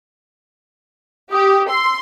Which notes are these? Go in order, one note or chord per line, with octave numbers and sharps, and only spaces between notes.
G4 D#6
C6 E6